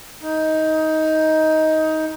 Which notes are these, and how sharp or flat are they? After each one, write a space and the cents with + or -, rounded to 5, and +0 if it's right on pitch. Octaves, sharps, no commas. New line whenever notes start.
D#4 +15